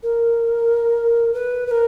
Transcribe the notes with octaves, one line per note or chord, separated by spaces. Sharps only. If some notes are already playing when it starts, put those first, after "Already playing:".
A#4
B4
B4
A#4